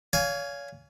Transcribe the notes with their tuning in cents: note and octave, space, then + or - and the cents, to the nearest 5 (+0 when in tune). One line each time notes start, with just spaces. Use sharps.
C#5 +40 F5 +0 G#5 +0